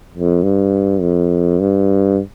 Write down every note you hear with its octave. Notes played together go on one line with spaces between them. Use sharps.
F2
G2
F2
G2